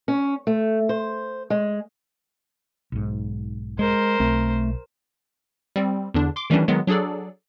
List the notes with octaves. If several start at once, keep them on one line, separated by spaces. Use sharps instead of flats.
C#4
A3
C5
G#3
B1 G#2
G#3 A#4 C5
B1 A3 C4
G3 C4
E2 D3 D4
C6 D6
D#3 E3 G3 A3 C#4 D4
D#3 F#3 G#3 B3
F#3 D4 G#4 A4 D5